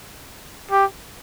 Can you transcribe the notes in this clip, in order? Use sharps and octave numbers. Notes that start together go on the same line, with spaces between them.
G4